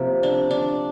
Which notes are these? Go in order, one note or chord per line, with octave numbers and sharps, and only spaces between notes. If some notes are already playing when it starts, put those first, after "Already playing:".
Already playing: C3 F3 A#3
D4
D4